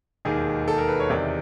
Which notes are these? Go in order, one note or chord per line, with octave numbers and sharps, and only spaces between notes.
E1 D#2 D#3 G#4
A4
A#4
B4
C#5
E2 C3 D#3 D5